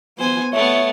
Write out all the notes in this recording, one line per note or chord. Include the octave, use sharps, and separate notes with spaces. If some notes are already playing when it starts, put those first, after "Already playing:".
B3 C5 G#5
A3 B3 C#5 E5